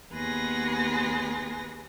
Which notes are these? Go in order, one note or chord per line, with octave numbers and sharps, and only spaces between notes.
D#2 B3 G#4 B4 C6 A#6